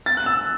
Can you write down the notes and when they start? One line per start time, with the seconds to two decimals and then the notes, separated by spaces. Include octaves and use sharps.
0.06 A6
0.17 F#6
0.26 E6